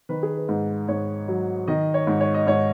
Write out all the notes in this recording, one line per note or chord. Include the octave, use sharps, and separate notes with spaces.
D#3 B4
G#4
B4
G#2
G#2 C#5
F#3
D#3 D#5
C#5
G#2
C#5
D#5
G#2 C#5